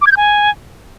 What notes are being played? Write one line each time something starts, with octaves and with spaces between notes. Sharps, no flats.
D6
G#6
G6
G#5